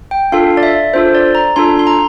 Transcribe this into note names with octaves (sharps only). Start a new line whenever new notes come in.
G5
D4 F4 A4 F5
D5
E5
D4 F4 A4 C5
D5
A#5
D4 F4 A4 C6
C6
A#5